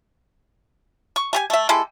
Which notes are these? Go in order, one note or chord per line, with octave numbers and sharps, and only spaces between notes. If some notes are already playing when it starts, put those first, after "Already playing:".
C#6
A3 G4 G#5
A3 E5
G#3 E4 G4 A4